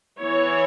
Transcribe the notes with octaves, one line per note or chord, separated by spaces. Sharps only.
E3 B3 E4 C#5